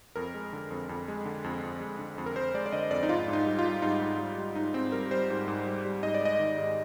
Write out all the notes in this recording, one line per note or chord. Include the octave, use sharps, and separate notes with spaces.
F2 A#4
G#3
D3
F2
F2
G#3
D3
F2
F2
G#3
D3
F2
A#4
F2 C5
G#3 D5
D5
D3 D#5
F2 D5
D#4
G#2 F4
G#2
D#4
G3
F4
G3
G#2 D#4
G#2
G3
G3
G#2 D#4
G#2 C4
G3 A#4
G3 C5
G#2
G#2
G3
G3
G#2 D#5
D5
G#3 D#5
D#3
G#2